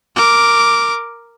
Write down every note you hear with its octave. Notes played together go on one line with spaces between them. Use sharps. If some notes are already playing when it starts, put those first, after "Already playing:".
A#4 D6